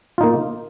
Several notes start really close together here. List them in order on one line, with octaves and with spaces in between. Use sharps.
F4 D#4 A#3